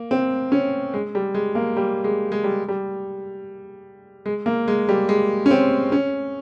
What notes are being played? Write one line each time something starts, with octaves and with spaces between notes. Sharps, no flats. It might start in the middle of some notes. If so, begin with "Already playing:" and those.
Already playing: A#3
C4
C#4
G#3
G3
G#3
A#3
G3
G#3
G#3
G3
G3
G#3
A#3
G#3
G3
G#3
C#4
C4
C#4